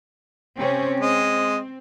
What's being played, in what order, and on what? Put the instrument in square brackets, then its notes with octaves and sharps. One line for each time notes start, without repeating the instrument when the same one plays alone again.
[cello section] C3 C4 C#4
[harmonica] G#3 D#5 [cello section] C4